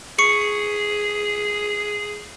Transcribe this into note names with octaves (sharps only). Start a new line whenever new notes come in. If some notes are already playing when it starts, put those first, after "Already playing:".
G#4 C#6 C#7